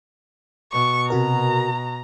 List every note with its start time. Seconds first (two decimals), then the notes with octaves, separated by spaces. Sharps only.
0.73 B2 C#6
1.10 C3 F#4 A#4 A#5